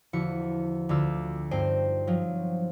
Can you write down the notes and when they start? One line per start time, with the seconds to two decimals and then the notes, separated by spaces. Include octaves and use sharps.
0.13 E2 D3 F3 E4 F#4 C#7
0.89 D2 D3 F4 E6
1.51 G2 C4 D#4 C5 G5
2.07 F3 F#3